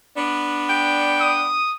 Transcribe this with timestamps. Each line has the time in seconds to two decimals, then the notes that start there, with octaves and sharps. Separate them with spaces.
0.17 B3 D4
0.69 G5
1.21 D#6